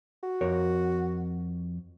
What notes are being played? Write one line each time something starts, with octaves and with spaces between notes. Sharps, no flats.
F#4
F2 A#4 C#5